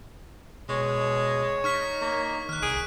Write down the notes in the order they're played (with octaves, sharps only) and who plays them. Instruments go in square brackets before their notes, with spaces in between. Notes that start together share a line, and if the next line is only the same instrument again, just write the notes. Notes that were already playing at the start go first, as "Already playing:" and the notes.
[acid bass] B2 [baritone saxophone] G#3 [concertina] C#5
[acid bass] D#4 [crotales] C#6 F6 B6
[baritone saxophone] A#3
[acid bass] D#3 [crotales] F6 F#6
[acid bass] C2 [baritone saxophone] G#4 [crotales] D7